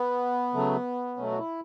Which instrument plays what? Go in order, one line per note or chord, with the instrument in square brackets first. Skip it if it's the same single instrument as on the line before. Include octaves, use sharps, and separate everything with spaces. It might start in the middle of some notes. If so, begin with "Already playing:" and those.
Already playing: [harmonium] B3
C#3 F#3 A3
B2 F#3 A3 C#4
F#4
E4